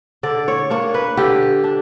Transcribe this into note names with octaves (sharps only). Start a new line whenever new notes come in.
D3 D5
C#5
A#3 D4 C#5
B4
D3 G4
D4